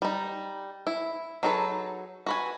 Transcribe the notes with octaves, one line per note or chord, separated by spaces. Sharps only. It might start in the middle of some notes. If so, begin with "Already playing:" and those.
G3 D#4
E4
F#3 D#4 G#4 A4 B4
F#4 B4 G#5